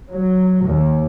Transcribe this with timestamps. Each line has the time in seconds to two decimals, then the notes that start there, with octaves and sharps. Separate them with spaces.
0.13 F#3
0.64 D#2